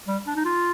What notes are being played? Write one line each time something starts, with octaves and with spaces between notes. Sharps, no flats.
G3
D4
D#4
F4